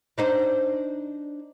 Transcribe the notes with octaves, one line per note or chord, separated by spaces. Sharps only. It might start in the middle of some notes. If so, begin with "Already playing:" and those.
D4 D#4 C5